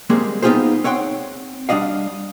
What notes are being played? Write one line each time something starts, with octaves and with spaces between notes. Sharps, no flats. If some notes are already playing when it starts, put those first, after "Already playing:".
G3 G#3 A#3 C4 G#4
B3 D#4 F4 G4 G#4 C5
C4 C#5 F#5 G5 C6
G3 D4 D5 D#5 F5